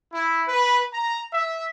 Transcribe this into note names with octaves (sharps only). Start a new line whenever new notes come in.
E4
B4
A#5
E5